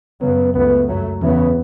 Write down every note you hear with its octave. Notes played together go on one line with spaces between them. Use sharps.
F#2 C#3 F#3 B3
C#2 C#3 A3 B3
F#2 F#3 A3
E2 C#3 E3 B3